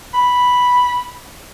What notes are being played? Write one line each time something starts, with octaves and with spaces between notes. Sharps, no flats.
B5